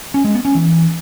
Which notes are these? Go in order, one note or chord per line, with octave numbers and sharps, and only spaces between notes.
C#4
G#3
B3
C#4
E3